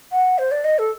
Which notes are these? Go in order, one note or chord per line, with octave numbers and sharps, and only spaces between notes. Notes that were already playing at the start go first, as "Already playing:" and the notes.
F#5
C5
D5
D#5
A4